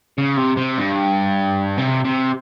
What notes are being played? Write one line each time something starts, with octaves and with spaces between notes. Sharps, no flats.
C#3
C3
C3
G2
C3
C3